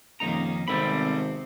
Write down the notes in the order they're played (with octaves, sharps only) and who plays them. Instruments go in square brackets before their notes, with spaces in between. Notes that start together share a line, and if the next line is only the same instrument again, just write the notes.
[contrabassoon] D#1 [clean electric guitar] F2 D#4 A#5 [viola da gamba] D#3 A#3 C#4
[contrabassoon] G#1 [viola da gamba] C3 B3 C4 [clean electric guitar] G3 A4 B5